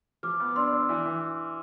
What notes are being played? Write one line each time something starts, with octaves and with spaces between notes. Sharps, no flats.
F3 D6 F6
B3
D4 C6 E6
D4
E3
E3